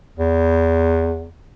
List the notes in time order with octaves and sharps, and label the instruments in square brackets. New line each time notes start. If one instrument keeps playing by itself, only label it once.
[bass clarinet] E2